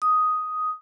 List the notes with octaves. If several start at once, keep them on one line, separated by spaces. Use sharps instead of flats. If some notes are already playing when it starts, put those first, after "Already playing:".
D#6